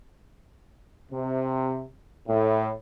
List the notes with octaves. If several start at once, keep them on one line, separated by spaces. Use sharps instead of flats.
C3
A2